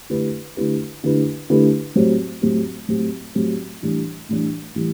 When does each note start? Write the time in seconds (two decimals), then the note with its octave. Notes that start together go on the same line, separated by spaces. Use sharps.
0.10 D3 A3 E4 G4 B4
0.57 D3 A3 E4 G4 B4
1.04 D3 A3 E4 G4 B4
1.50 D3 A3 E4 G4 B4
1.96 A2 F#3 C4 G4
2.42 A2 F#3 C4 G4
2.88 A2 F#3 C4 G4
3.35 A2 F#3 C4 G4
3.82 A2 E3 G3 D4
4.29 A2 E3 G3 D4
4.75 A2 E3 G3